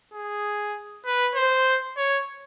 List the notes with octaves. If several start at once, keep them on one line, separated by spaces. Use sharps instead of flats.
G#4
B4
C5
C#5